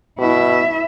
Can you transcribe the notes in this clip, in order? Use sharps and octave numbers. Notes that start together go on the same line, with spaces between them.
B2 E4 E5